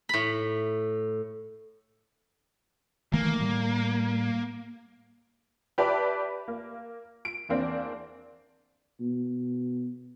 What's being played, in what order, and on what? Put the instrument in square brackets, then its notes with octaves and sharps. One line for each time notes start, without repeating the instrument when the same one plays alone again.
[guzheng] A2 B5
[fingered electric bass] D#3 E3 A3 [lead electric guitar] A#3
[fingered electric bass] A2 G3
[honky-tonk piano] G4 B4 D5 E5 A5 B5
A#3
D7
E2 A#3 C4 D4
[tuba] B2